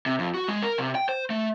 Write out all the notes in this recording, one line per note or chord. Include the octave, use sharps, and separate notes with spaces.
C3
F2
F#4
G#3
A#4
C3
G5
C5
A3